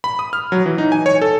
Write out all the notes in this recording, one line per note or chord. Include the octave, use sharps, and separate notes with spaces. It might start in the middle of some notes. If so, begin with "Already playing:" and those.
B5
D#6
F6
F#3
E3
D#4
G#5
C#5
A4